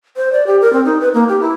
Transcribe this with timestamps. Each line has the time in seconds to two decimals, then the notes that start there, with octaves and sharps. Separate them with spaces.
0.16 C5
0.32 D5
0.47 G4
0.61 A#4
0.73 C4
0.85 D#4
1.00 B4
1.14 A#3
1.29 G4
1.41 E4